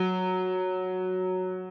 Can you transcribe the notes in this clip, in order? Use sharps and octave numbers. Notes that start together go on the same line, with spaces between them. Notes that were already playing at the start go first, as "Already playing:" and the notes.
Already playing: F#3